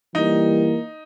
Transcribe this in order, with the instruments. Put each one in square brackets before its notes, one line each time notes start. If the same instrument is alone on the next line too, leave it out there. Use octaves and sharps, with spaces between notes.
[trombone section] E3 G3 A#3 [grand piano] D#4